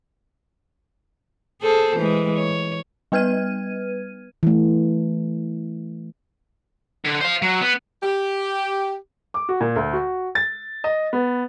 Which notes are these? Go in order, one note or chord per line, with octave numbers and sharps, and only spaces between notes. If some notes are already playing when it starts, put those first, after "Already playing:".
G#4 A4 C5
E3 G#3
C#5
G3 B3 B4 F6 G#6 D#7
E3 A3
D3
C5 F5
F#3
B3
G4
D6
F#4
A#2
D2
F#4
A6
D#5
B3